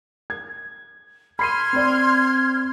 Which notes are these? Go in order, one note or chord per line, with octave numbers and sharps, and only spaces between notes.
G#6
B5 C6 F6 G#6 C7 D#7
C4 D5